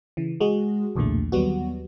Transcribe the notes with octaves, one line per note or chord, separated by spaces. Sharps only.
C#3 E3
G#3 F#4 G#4
B1 E2 A#2 D3 A3
D#2 F#3 G3 B3 F#4